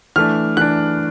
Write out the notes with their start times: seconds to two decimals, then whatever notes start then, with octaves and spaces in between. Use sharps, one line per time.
0.16 E3 A3 D4 F6
0.57 E3 A3 D4 F#6